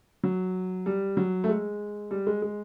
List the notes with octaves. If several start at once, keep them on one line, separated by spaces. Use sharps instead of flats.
F#3
G3
F#3
A3
G#3
G3
G#3
G#3